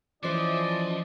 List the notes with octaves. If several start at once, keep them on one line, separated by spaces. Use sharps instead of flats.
E3 F3 C#4 E4 C5 D5 D#5